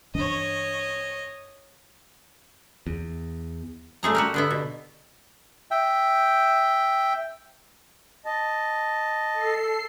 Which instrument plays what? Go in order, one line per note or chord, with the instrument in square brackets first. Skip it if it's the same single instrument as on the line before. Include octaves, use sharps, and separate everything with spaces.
[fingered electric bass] G2 E3 D4 [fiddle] C#5 D#5
[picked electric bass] E2
[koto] G3 A3 G#4 A#5
F#4 G4 A#4
D3 B3 E4
B2
[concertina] E5 G5
[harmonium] D#5 A5
[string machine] A4 C7